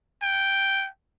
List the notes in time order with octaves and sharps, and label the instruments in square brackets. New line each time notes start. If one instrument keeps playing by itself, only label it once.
[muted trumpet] G5